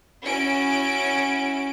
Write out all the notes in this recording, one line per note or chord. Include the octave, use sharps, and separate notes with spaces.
C#4 E4 F#4 D7